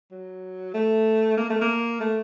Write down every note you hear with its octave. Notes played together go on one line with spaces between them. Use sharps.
F#3
A3
A#3
A3
A#3
A3